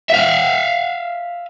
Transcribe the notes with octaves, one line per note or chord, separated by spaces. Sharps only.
E5 F5